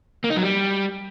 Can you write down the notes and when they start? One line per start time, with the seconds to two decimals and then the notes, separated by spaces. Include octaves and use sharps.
0.24 A#3
0.30 D#4
0.37 F#3
0.43 G3